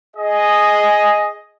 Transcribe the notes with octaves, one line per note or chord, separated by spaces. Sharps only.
G#4 D#5